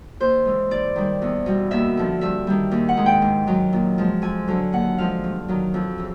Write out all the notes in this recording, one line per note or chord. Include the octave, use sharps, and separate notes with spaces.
D#2 C5
C#3 E3 G#3
G#2 D5
D#3 G3
E2
B2 G3
D#2 E5
D3 F3
G2 E5
D#3 G3
D#2
F#5
D#3 G#3
G5
G#2
D#3 F#3
A#2
F3 G#3
F2 G#5
D3 F#3
D#2 F#5
D3 F3 G#3 F5
G2
D#3 F#3
F2
C#3 E3